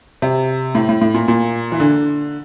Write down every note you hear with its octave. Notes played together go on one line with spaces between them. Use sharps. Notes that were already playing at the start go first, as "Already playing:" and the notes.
C3
A2
A2
A2
A#2
A#2
E3
D3